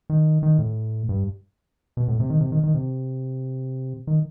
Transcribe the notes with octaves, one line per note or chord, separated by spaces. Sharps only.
D#3
D#3
A2
G2
B2
A2
C3
D#3
C3
D#3
D#3
C3
D#3